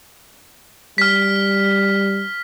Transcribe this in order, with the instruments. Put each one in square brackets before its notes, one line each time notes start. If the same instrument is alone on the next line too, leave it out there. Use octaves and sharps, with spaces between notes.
[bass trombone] G3 [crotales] F6 B6